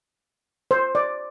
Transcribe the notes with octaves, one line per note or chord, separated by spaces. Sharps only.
C5
D5